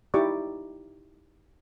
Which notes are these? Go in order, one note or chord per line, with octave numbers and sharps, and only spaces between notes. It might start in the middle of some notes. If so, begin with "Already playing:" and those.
D#4 E4 G4 D5 C#6 D6